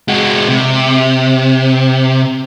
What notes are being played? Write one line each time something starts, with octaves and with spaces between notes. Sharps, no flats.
G#3 F#4
C3